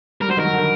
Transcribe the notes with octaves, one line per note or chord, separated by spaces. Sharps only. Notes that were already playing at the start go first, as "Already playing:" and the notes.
G3 A#4
F#3 C5
D#3 A#4
F#3
D3
D#3